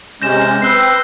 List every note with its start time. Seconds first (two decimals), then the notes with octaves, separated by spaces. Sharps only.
0.22 C3 G#3 C#4 G6 A#6 E7
0.62 C4 B4 E6 G6 C7